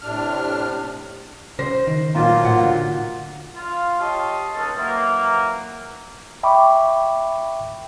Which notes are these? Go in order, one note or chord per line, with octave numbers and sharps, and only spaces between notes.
A2 C3 D4 F6
C#3 C5 A#6
D#3
B1 A#2 A#3 F4
A2 F#5
D3
F4
G4 C#5 D#5 A5 C6
C#2 G#3 C#4 D#4 A4
E3 F#3 A#3
E5 G5 B5 C#6 D6